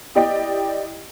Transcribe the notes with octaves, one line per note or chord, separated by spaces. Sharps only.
E4 G4 D5 D#5 G5